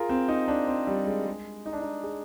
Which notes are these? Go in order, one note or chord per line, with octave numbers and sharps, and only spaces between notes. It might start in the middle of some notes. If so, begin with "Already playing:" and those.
Already playing: F4 G#4 A#4
C4
D#4
D4
C4
G3
G#3
G#3
D#4
D4
D#4
G#4